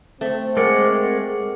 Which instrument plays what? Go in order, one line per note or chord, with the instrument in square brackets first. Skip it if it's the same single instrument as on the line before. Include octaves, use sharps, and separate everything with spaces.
[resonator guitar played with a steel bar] A3 [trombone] C4
[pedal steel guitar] G#3 D5 F#5 [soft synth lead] A#4